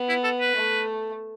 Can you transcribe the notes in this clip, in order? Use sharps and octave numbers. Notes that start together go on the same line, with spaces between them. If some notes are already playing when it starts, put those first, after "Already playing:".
Already playing: B3
E4
A4
B4
A3